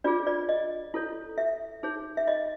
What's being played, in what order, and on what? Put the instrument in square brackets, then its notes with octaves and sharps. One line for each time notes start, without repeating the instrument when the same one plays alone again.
[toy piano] D4 F4 G#4 D5
D5
D#5
E4 A4 C#5
E5
D#4 G#4 C#5
E5
D#5